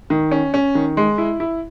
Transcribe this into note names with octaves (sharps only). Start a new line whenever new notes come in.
D#3
C#4
C#4
D#3
G#3
E4
E4